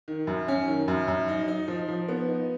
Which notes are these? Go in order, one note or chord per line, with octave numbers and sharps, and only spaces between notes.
D#3
F#2
C#4
D#3
F#2
F#2
D#4
D#4
F3
F3
B3
D#4